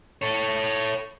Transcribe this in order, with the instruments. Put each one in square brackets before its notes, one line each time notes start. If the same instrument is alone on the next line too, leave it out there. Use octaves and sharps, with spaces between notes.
[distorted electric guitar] A4 C#5